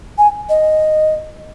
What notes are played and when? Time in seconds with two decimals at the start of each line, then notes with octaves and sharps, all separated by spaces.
0.18 G#5
0.49 D#5